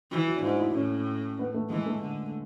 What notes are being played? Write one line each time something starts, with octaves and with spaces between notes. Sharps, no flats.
E3 F#3
F#3
D4
G#2 E4
E4
A2 C#4
B3
A3
E3 G#3
A3
D3